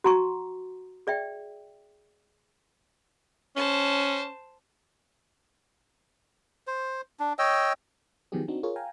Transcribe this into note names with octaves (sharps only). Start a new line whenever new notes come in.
F#4 F#5 A#5 C6 C#6
G#4 D5 E5 G5
C#4 C5 A5
C5
D4
C#5 D#5 G5 E6
D#3 F3 F#3 B3 G4 G#4
C4 D4 D#4 F#4
F4 G#4 A#4 C#5
F5 G5 G#5 A#5